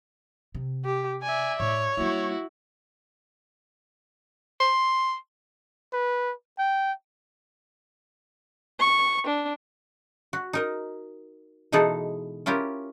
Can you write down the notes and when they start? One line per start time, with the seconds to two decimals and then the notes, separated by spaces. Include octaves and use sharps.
0.55 C3
0.85 G4
1.23 D5 E5 G#5
1.60 A2 C#5
1.97 G3 A#3 E4 F#4
4.60 C6
5.93 B4
6.59 G5
8.80 C#6
9.26 D4
10.33 F#4
10.53 D#4 A#4 D#5
11.72 B2 E3 G#3 D#4 G#4 A4
12.46 C#4 E4 F4 G4 A#4